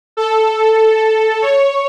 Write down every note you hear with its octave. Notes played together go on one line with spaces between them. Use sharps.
A4
C#5